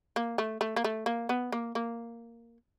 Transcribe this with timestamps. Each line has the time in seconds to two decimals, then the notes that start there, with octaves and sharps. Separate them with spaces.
0.16 A#3
0.38 A3
0.61 A3
0.76 A#3
0.84 A3
1.06 A#3
1.29 B3
1.52 A#3
1.75 A#3